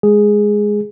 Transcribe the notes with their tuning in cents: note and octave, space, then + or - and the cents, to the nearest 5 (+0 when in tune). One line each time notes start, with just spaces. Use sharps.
G#3 +0 G#4 +0